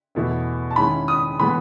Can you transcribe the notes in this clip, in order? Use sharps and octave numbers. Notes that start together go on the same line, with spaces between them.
E2 B2 A3 E4
A5
D#3 G#3 C#4 E4 B5
D#6
A2 E3 G#3 B3 B5